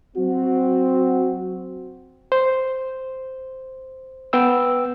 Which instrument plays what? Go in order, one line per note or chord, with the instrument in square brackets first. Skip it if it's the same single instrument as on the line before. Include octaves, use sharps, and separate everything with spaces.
[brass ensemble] F#3 C4 F#4
[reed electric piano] C5
B3 G5 E6